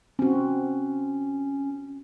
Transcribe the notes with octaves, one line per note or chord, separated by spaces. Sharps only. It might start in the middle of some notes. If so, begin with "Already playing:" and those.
C4 C#4 F#4